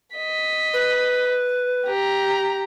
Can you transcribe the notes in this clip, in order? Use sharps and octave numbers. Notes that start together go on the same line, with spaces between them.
D#5 B6
B4
G4 A#5